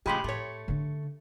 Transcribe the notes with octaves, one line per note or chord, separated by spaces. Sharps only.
A2 C#3 F3 G#3 G4 B5 C6
A2 A3 C#5
D3 D4